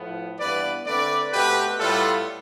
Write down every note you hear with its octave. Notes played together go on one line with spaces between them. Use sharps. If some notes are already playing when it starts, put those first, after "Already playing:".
Already playing: A2 F3 B3
G2 E3 B3 B4 D5
D3 A3 C4 B4 D5
B2 A3 C4 G4 B4
A2 G3 B3 F4 A4